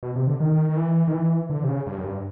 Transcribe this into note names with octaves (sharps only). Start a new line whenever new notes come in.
B2
C3
D3
D#3
D#3
E3
D#3
E3
D3
C3
C#3
G2
F#2
G2